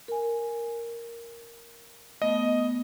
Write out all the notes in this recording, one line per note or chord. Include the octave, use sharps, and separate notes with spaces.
A#4 G#5
A3 B3 D#5